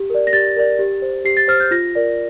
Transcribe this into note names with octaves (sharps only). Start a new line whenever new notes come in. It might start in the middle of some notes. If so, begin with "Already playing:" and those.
Already playing: G4
A#4 D5
A#6
G4 A6
A#4 D5
G4
C5
G4 C7
A6
C5 F6
G6
F4 A#6
A#4 D5